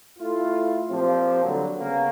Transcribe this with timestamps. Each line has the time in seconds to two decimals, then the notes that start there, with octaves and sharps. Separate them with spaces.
0.18 A3 E4 F4
0.91 A#2 F3 C4 G4
1.44 D3 F#3 G3
1.77 C#3 A#3 B3 C#4